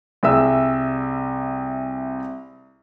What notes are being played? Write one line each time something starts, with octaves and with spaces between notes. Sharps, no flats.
C2 G#4 E5 E6